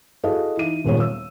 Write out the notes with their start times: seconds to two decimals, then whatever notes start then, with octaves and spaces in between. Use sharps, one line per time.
0.24 E4 F#4 G#4 A4 D#5 F5
0.57 E3 D#4 D#7
0.85 D#1 A#2 G#3 B3 C#5
1.00 E6